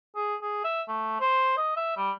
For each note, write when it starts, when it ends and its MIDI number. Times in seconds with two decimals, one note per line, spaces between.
0.15 0.35 68
0.42 0.63 68
0.64 0.82 76
0.88 1.20 57
1.21 1.54 72
1.57 1.72 75
1.76 1.93 76
1.97 2.11 55